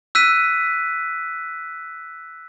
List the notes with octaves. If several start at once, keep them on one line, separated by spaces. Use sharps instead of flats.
E6 F#6 B6 D#7